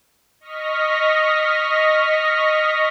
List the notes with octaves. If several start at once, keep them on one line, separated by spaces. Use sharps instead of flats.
D#5 C#6 F6 A#6 B6